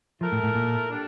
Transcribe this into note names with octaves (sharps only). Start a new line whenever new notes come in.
F3 A3 E4 A#4
A2
A2
A#2
D3 G3 D4